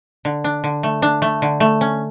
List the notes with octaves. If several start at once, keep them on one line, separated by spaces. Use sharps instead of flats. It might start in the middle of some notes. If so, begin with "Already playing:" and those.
D3
D4
D3
A3
D4
A3
D3
A3
C#4